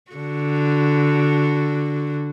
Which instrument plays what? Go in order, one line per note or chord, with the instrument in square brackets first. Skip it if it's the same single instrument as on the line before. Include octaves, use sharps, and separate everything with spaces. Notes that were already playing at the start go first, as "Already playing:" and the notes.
[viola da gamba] D3 F#4